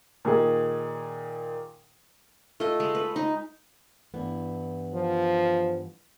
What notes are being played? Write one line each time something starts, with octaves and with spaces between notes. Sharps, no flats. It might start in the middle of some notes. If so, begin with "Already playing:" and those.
A#2 D#3 G#4
A3 F4 D#5
G#3
B4
D#4
G2 E3 B3
F3